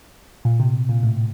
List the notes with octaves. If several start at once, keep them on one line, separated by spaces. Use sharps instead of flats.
A#2
C3
A#2
A2